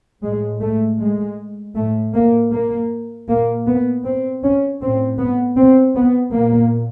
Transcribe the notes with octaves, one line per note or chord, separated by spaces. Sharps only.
A2 G#3
A3
G#3
A2 A3
A#3
A#3
A#2 A#3
B3
C4
C#4
A2 C4
B3
C4
B3
A#2 A#3